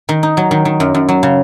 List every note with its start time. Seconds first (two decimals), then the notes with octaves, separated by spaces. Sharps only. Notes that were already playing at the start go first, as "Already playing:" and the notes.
0.09 D#3
0.23 D#4
0.37 F#3
0.51 D#3
0.65 D#3
0.80 F#2
0.94 F#2
1.09 F#3
1.23 C#3